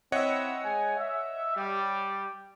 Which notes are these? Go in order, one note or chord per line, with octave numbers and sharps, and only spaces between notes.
C4 E4 C#5 D#5 E5 F#5
G#3 G#5
E5
G3